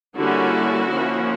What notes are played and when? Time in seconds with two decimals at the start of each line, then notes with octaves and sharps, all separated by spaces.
0.16 D3 G3 A#3 C#4 E4 F#4
0.89 F3 A#3 C#4